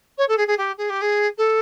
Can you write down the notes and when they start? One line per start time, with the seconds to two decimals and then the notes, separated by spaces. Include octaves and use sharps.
0.17 C#5
0.28 A4
0.37 G#4
0.47 G#4
0.58 G4
0.77 G#4
0.89 G4
1.01 G#4
1.37 A4